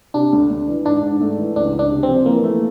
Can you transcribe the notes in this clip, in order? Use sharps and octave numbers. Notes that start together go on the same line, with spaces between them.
C3 D4
D2
D2
E3
G#2 D4
G#2
A3
E3
C#2 D4
C#2
D4
C3
C4
F3
E3 A#3
A3